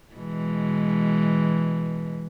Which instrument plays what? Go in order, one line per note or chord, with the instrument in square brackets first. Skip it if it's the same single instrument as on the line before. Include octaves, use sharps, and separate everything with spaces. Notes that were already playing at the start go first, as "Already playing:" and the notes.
[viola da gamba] B2 E3 G#3